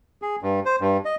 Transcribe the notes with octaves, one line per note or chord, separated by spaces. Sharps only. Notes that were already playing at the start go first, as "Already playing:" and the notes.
G#4
G2
C5
G2
D#5